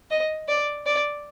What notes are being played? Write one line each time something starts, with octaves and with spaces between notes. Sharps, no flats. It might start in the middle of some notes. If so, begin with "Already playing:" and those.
D#5
D5
D5